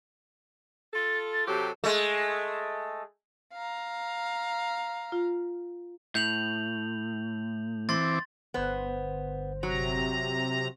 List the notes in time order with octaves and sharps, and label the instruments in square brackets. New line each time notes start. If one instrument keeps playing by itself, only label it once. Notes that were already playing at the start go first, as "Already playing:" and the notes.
[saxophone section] F4 A4 [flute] A6
[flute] A6
[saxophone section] C3 F#3 G4 [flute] A4
[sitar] G#3 A3
[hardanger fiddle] F5 A#5
[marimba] F4
[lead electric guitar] A2 [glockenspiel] G6 F7 F#7
[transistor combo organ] E3 C4 D6 [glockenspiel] C6 A6
[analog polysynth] G1 C5 [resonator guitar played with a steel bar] B3
[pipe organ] C3 A#5 [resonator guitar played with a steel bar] F#3